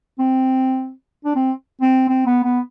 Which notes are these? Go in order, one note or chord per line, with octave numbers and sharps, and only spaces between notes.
C4
D4
C4
C4
C4
B3
B3